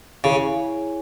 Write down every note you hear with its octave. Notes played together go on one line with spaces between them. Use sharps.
C#3 E4 G#4 C#5 G#5